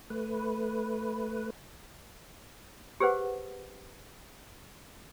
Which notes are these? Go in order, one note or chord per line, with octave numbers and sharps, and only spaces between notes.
A3 B4
G4 G#4 B4 C5 F#5